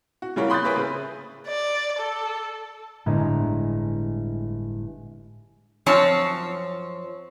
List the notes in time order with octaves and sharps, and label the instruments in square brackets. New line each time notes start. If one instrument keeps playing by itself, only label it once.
[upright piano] F#4
C#3 G3 E4 F4 A#4 C#5
B5 C6 D#6 F#6 G6 A6
G#4 A#4 B4 C#5 E5
C#3 B4
[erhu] D5
A4
[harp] G1 A2 G#3 A#5
[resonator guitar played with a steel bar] F#2 F3 C4 C#5 A5